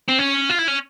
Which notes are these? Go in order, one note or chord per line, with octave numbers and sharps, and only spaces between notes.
C4
C#4
F4
E4
C#4